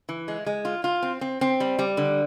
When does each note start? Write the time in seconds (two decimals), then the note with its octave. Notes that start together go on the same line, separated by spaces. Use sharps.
0.09 E3
0.28 G#3
0.46 G#3
0.65 F4
0.84 F4
1.03 C4
1.21 C4
1.41 C4
1.60 G3
1.79 G3
1.97 D3